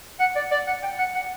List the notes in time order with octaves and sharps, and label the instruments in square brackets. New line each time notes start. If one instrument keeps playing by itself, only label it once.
[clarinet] F#5
D5
D5
F#5
G5
F#5
F#5